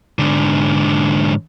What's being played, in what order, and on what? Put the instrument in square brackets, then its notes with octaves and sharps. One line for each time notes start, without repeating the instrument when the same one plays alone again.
[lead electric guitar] G#2 D3